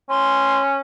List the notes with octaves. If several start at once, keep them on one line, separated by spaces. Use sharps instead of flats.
C#4 C6